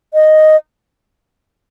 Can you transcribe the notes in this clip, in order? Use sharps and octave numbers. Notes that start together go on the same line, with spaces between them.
D#5